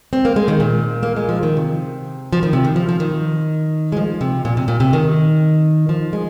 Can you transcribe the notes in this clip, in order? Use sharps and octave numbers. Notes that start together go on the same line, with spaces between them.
C4
A#3
G#3
D#3
A#2
A#3
G#3
F3
D#3
C3
F3
D#3
C3
D#3
F3
F3
D#3
G#3
F3
C3
A#2
C3
A#2
C3
D#3
F3
G#3